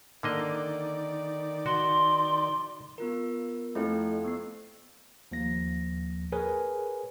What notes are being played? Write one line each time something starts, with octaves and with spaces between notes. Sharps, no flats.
D3 D#3 A#3 D5 D#5
F#4 C6
B3 F4 A#4
F2 A3 C4 E4
B3 C7
D#2 F3 A#3 A#6
G#4 A#4 B4 C#5 G#5